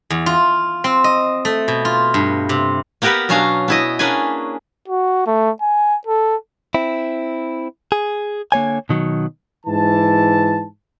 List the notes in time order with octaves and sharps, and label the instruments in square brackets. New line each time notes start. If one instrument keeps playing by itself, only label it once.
[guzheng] E2
F4
C4
D#5
A3
B2
F4
G2
C3
[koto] A#3 B3 G4 A#4 B4 F#5
B2 F#3 C#4 D4 F5 A#5
B3 E4 D#5
A#3 C#4 D4 G#4 B4 G#5
[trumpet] F#4
A3
G#5
A4
[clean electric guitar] C4 E4
G#4
D3 A#3 C#5 G#5
B2 D#3 F#3
[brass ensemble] G#2 E3 A5